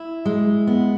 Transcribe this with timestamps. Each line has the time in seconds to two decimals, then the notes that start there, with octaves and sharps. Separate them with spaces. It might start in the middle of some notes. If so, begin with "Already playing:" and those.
Already playing: E4
0.25 G#3
0.67 B3